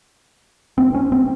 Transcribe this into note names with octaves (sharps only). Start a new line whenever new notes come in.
C4
C#4
C4